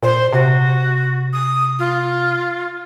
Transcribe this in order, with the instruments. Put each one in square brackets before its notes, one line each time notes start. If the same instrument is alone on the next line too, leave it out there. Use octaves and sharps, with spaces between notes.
[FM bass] A#2 [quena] C5
[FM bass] C3 [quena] F#4
[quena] D#6
F4